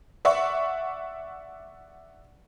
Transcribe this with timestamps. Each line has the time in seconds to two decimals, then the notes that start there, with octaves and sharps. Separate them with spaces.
0.25 D5 E5 F#5 C#6